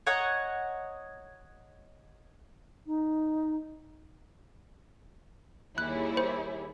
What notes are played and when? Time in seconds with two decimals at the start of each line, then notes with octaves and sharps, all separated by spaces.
0.07 C#5 D#5 F#5 A#5
2.86 D#4
5.78 D#2 G3 E4 G#4 C#5 F#6
6.17 C5